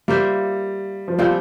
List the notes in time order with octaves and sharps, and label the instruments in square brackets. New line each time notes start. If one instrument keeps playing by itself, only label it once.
[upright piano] G3 [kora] A#3 F4 C5 E5
[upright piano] F3
[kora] A#2 F3 C4 [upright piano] G3